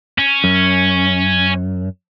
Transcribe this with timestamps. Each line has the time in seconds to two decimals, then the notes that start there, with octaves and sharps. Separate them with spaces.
0.18 C#4
0.44 F#2